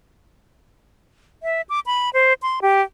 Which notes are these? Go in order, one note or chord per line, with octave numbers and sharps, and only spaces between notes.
E5
D6
B5
C5
C6
G4